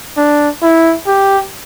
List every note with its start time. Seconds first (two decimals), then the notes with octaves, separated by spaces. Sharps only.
0.17 D4
0.62 E4
1.07 G4